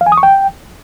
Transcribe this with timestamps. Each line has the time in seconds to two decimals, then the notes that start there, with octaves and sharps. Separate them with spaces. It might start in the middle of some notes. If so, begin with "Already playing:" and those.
0.01 F5
0.06 G#5
0.12 D#6
0.17 C#6
0.23 G5